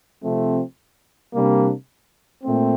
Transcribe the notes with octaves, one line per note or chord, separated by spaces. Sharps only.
C3 F3 A3 C4
C3 G3 A#3 D4
A#2 A3 C4